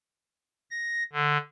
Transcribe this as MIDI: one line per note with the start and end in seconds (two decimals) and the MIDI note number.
0.70 1.03 94
1.13 1.37 50